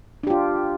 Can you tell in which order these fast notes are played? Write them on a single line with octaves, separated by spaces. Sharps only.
D4 G4 F4